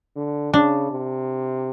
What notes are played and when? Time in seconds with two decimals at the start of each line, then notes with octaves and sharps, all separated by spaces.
0.16 D3
0.53 C#3 D4
0.91 C3